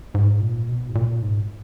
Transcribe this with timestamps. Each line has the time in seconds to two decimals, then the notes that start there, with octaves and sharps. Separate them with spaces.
0.14 G#2
0.40 A#2
0.68 B2
0.89 G#2
0.95 A#2
1.22 G#2